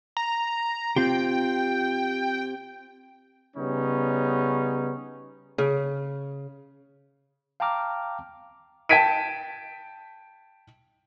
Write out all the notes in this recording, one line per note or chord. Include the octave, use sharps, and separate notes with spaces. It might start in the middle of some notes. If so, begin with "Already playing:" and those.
A#5
C4 F4 G4 G5
C#3 G3 B3 C#4 D#4
C#3
F5 G5 A5 A#5 D6 F6
G5 A5 G#6 B6 D7 D#7